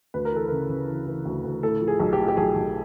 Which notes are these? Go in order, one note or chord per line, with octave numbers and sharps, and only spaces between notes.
D2 B4
A#4
E3 A4
C#3 A#4
C#3
E3
E3
D2
D2
A2 A4
F3
G#4
B1
G4
A2
G4
B1 G#4
B1